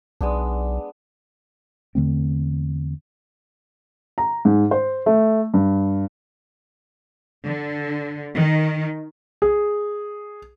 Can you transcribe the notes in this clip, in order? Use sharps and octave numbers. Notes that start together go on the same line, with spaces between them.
B1 G#3 B3 D4
E2 D3 A3 C4
A#5
G#2
C5
A3
G2
D3
D#3
G#4